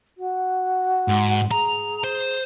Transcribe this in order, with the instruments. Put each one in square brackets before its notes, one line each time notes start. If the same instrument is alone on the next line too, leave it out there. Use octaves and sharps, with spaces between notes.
[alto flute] F#4
[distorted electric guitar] G#2
[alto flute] G#4 [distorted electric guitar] A#5
[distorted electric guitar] C5